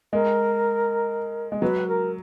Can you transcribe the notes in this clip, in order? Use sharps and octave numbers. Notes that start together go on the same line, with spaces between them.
G#3 A#4
G#3
F#3 B4
A#4